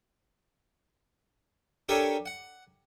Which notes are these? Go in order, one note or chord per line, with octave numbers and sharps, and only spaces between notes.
D4 G4 A4 A#4 C#5 G#5
F#5